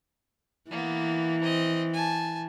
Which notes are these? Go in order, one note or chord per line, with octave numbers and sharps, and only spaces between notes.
E3 A#3 B3
C4 D#5
G#5 A5